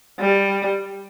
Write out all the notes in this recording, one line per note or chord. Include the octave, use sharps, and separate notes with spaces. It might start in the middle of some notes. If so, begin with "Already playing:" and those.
G3